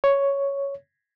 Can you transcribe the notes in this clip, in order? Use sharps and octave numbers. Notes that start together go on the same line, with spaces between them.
C#5